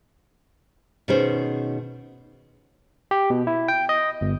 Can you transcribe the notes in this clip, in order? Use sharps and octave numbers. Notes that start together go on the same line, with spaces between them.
B2 D#3 C#4 G#4 C5
G4
B2
E4
G5
D#5
G1